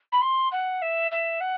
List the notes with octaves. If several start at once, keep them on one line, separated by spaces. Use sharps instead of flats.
B5
C6
F#5
E5
E5
F#5